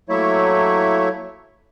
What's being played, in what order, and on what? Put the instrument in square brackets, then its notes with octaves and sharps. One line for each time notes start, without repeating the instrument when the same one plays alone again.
[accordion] F#3 A3 A#3 E4 C#5 E5